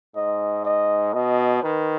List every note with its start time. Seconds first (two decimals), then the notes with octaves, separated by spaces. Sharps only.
0.16 G#2 D#5
0.65 D#5
1.14 B2 D#5
1.62 D#3 B4